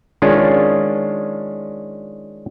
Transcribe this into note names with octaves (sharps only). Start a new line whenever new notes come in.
D#3 G#3 C#4 D4 F4